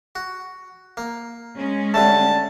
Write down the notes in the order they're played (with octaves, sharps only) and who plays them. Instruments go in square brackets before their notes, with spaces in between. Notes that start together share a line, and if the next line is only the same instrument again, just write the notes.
[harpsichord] F#4
A#3
[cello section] G#3 C#4
[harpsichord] D3 G3 A3 [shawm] A5